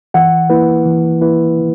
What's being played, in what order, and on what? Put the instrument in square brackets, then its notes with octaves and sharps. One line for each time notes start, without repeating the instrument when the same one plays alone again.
[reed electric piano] E3 [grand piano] F#5
[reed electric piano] A#3 E4 B4
E3
A#3 E4 B4